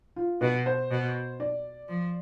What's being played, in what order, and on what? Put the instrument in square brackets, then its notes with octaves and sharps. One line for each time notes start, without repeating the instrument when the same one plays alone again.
[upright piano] F4
[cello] B2 [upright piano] B4
[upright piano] C5
[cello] B2
[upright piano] D5
[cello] F3